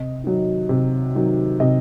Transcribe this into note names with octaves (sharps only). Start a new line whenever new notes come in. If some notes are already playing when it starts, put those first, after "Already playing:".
Already playing: C3 D#5
D#3 F#3
C3
D#3 F#3
C3 D#5